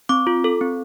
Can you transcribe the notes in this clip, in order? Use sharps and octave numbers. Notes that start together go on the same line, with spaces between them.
C4 D6
F4
A4
C4